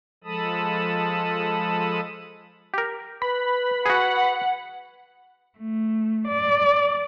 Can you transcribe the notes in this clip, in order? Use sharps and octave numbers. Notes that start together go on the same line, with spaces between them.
F3 G#3 A4 A5 B5 D#6
G4 A#4
B4 B5
F#4 G#4 F#5
A3
D5